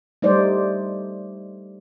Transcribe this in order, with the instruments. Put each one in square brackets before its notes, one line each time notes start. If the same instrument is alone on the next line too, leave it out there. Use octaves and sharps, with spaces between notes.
[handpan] G3 A3 D#4 C5 D5